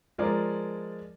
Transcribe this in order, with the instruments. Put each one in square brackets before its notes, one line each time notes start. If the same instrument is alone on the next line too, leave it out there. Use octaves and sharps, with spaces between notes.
[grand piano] F3 G#3 A#4 D5